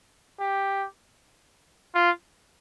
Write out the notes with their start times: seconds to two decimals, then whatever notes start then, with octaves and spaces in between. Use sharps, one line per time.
0.40 G4
1.95 F4